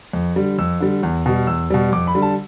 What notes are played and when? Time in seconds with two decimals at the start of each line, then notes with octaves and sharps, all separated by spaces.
0.13 F2
0.36 D3 G3
0.59 F2 E6
0.80 D3 G3
1.03 E2
1.26 B2 G3
1.47 E2 E6
1.70 B2 G3
1.92 F2 D6
2.07 B5
2.15 D3 G3
2.22 A5